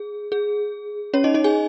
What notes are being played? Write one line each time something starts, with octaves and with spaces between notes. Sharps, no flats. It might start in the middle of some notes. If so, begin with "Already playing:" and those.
Already playing: G#4
G#4
C#4 C#5
D#4 D#5
D#4 D#5
G#4 G#5